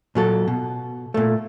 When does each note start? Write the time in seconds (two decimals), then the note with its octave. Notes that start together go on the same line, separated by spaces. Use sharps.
0.15 A#2 F#3 A4
0.48 B2
1.14 A#2 A3